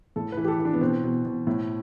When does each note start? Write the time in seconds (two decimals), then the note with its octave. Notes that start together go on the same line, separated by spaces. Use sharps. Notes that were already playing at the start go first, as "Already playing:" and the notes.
0.16 A2 A4
0.32 B4
0.37 E3
0.44 G4
0.48 A4
0.59 E3
0.65 D4
0.74 B3
0.81 B2 C4
1.04 B2
1.25 B2
1.47 A2